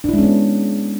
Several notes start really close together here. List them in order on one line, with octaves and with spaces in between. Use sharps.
D4 E4 G#3 C#4 B3